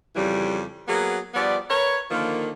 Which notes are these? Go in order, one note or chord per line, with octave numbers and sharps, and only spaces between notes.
F2 C#3 E3 G3
F#3 A#3 B3 G#4
F3 G3 B3 D5
A#4 B4 C#5
D3 D#3 F3 A#3